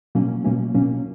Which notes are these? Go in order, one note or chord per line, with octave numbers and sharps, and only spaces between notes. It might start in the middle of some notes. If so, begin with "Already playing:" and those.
B2 F#3 A#3 C#4
B2 F#3 A#3 C#4
B2 F#3 A#3 C#4